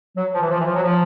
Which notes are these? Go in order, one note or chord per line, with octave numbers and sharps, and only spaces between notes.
F#3
F3
E3
F3
E3
F3
F#3
F3